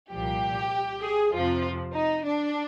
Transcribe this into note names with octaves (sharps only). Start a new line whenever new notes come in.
C2 A#2 F3 G4
G#4
F2 C3 F3 F4
D#4
D4